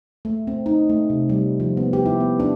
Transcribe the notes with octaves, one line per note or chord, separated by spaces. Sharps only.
A3
C4
D#4
A3
C3
G3
F3
B3
G4
E4
B3
D4